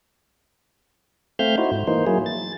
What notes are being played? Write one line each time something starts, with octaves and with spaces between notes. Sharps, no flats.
A3 C4 E5 F5 F6 G6
D#4 E4 F#4 C5
G#2
E3 A#3 D#4 C5
F#3 A#3 E4 G#4
A6